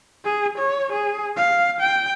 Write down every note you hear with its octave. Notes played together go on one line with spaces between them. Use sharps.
G#4
C#5
G#4
F5
G5